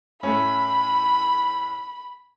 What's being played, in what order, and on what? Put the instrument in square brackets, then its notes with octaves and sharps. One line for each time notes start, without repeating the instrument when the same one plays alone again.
[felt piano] A2 A3 C#4 [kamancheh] B5